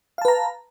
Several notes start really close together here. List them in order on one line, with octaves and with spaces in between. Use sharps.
F5 A5 B4 A#5